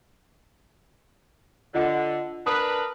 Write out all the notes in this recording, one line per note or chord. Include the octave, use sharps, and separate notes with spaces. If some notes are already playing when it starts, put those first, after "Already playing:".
D3 F4 D#5 F#5
D4 A#4 B4 D#6